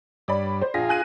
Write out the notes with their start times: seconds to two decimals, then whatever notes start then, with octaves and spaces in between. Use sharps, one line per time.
0.28 G2 C#5 D5 B5
0.62 C5
0.74 A#1 F4 G#4 A#6
0.89 G#5 F#6 D#7